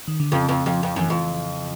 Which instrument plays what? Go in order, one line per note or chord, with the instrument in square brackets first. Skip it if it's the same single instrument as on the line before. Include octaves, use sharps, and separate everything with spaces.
[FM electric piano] D#3
D3
[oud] F2 [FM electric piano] C#3
[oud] F2
[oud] F2 [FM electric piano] F3
[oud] F2
[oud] F#2 [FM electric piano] E3
[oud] F2